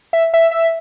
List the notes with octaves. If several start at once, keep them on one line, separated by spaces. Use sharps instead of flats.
E5
E5
E5